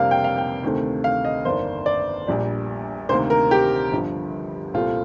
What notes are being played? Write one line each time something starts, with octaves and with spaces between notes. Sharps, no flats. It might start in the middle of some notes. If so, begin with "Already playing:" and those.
Already playing: F2 C3 G3 A#3 D4 F5
G5
F5
G5
D2 C3 D#3 A3 C4
F5
D#5
G1 F2 D#3 A#3 D4 C5
D5
A#1 A#2 G3 D4
D2 C3 D#3 A#3 C5
A#4
G4
G1 G2 D3 F3
C2 A#2 A3 C4 F4